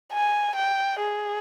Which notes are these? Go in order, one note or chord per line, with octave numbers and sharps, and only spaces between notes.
G#5
G5
G#4